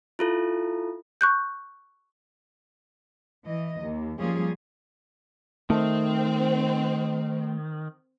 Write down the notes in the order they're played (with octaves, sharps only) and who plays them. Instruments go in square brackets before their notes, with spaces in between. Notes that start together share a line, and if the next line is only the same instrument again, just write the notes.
[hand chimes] E4 F4 A4
[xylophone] C#6 F#6 G6
[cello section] E3 D#5
D#2
F3 G3 A#3 C#4 F4 G#4
[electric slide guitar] D#3 [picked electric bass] A3 [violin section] C4